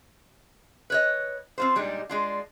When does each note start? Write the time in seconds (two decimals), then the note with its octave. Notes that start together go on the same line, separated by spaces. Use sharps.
0.90 B4 C#5 D#5
1.58 C4 F4 C5
1.75 A#2 G3 G#3 D4 D#4
2.09 G#3 D4 F4